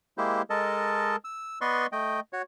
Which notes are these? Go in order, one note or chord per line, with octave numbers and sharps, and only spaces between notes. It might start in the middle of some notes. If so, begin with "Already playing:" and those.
G#3 A#3 E4 G4 C5
G#3 A4 A#4 D#5 A5
E6
B3 B4 D5 D#5 C6 C#6
A3 D#5 G5
F#4 C#5